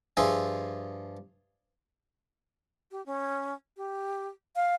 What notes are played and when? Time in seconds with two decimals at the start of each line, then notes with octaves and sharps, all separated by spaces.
0.17 G2 F3 F4 G#4 E5 G#5
2.92 G4
3.06 C#4
3.77 G4
4.56 F5